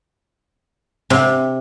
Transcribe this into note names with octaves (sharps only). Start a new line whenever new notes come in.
C3